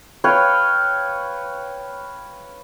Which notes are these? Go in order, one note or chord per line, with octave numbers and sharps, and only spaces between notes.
B4 C#5 F5 G5